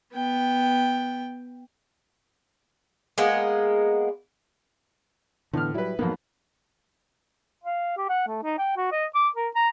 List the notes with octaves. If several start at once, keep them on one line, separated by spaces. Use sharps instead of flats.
B3 G5
G#3 A#3 B3
A2 D3 E3 B3 F6
F#3 G3 E4 B4
F2 G#2 F#3 A#3 B3
F5
G4
F#5
A3
D#4
G5
F#4
D#5
D6
A#4
A#5